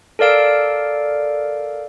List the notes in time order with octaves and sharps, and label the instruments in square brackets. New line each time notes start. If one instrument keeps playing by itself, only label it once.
[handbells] A4 A#4 D5 F5 D7